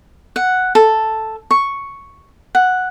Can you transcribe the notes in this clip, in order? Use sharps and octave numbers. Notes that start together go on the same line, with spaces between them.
F#5
A4
C#6
F#5